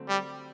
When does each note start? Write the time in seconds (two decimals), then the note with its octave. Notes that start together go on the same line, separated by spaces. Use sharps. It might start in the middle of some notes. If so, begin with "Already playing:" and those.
Already playing: D3 F#3 A3 C4
0.09 G3